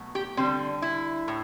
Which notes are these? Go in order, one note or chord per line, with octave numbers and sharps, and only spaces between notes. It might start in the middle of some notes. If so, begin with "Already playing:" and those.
Already playing: B2 F#3 A3
G4
D3 G3 C4
E4
A2